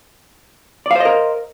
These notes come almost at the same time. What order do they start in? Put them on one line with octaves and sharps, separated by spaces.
D5 F5 C5 D#5 A#4